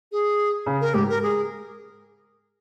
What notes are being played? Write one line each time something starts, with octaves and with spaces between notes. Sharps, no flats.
G#4
C#3
A#4
G#2 G4
A#4
G#4